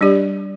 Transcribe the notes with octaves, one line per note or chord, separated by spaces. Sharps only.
G3 D4 G4 D5